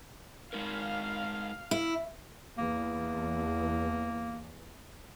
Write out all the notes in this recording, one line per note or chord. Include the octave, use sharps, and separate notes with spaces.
G#3 D#4 A#4 F5
E4
E2 A#3